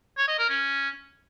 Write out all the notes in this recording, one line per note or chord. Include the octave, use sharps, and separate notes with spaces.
C#5
D#5
A#4
C#4